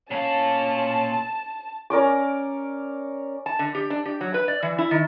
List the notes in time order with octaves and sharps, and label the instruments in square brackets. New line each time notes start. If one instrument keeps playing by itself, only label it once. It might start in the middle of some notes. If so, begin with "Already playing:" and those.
[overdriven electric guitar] A#2 F5 [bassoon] C#4 [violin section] A5
[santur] C#4 A#4 D5 D6
[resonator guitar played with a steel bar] A5
D3
G4
D4
G4
F#3
B4
D5
E3
E4
D#3